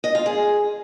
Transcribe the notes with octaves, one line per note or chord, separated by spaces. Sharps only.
D#5
F4
G#4